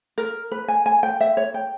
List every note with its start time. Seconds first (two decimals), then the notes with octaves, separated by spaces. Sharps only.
0.18 A#4
0.52 B4
0.68 G#5
0.86 G#5
1.03 G5
1.21 E5
1.37 C#5
1.54 G5